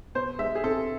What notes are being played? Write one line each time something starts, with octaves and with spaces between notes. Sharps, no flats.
B2 C5
G#3 E5
G#4
C4 A4